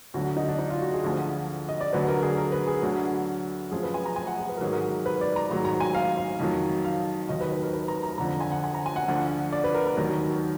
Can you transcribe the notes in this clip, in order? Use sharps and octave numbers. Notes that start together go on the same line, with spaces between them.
D2 D3 F#3 F#4
D#4
D4
D#4
F4
F#4
G#4
D2 D3 F3
D#5
D5
D2 D3 F#3 B4
A#4
G#4
A#4
B4
G#4
D2 D3 F#3
F#2 F3 G#4
B4
G#5
A#5
G#5
F#5
G#4
B4
A#4
G#2 D#3 F#3 G#4
A#4
B4
D5
A#5
G#2 D#3 F#3 A#5
A#5
G#5
F5
F5
F2 D#3 F#3
F5
D#2 D#3 F#3 D#5
B4
B4
A#4
B4
A#5
A#5
F2 D3 F3 A#5
G#5
F#5
G#5
A#5
G#5
F#5
D2 D3 F3
D5
B4
A#4
A#4
D#2 D#3 F#3